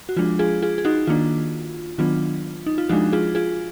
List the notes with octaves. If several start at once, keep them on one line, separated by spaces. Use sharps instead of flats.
F#4
F3 G#3 D4 F4
F4 G#4
F4 G#4
G#4
D#4 F#4
D#3 A#3 D4 F4
D#3 F#3 B3 D4 F4
D#4
F4
F3 G#3 D4 D#4 F#4
F4 G#4
F4 G#4